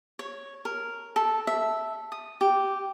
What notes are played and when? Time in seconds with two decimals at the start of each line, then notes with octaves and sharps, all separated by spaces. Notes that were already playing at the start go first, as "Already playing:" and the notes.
0.19 C#5
0.65 A#4
1.16 A4
1.47 E5
2.12 D#6
2.41 G4